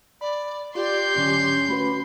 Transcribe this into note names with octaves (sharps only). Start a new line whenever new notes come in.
D5 B5
F4 G4 D5 C6 G6
G#2 D3 F#3 C#4
A3 F#4 B4 B5